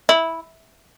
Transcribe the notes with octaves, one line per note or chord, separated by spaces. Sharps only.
E4